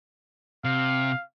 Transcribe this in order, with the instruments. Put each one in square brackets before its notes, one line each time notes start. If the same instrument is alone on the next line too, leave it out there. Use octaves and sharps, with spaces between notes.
[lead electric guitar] C3 [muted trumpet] F5